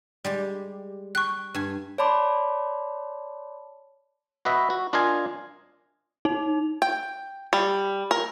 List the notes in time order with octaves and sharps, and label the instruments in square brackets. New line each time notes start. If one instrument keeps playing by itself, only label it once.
[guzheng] G3 G#3 G4
[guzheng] G5 [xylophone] C#6 F#6
[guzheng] G2 G#5
[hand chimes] C#5 D5 A5 B5 C6 D6
[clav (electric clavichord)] F#4 B4 D#5 E5
F#4
D4 F4 A#4 D#5 F5 G#5
[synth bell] D#4
[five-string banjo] G5
G3
A#4